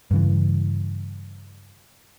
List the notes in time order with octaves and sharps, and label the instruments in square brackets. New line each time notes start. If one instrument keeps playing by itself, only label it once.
[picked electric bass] G2 C#3 E3